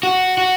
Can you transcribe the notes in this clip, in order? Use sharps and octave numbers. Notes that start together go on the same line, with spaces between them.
F#4
F#4